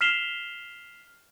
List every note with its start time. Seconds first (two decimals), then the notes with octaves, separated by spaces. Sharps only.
0.01 F6 B6 C7 E7 F7 G7